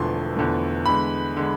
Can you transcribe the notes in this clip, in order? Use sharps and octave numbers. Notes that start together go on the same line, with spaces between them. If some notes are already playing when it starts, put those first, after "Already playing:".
Already playing: E1 E2 D3 F3 A3 C6
E1 E2 D3 F3 A3
E2 D3 G#3 B5
D3 G#3